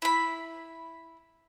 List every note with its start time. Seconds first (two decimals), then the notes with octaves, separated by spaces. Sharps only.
0.02 E4 B5